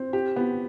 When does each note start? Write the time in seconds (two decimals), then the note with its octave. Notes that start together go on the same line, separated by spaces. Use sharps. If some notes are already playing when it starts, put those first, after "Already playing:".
Already playing: C4
0.13 G4
0.36 B3